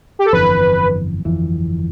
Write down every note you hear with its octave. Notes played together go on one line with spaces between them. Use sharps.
G4
A4
G1 F2 E3 B4
G1 F2 E3